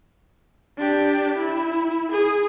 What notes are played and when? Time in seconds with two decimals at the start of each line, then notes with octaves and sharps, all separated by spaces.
0.77 D4 G4
1.37 E4
2.12 G#4